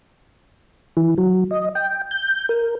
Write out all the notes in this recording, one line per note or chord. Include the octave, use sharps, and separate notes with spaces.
E3
F#3
D#5
G5
G6
A#4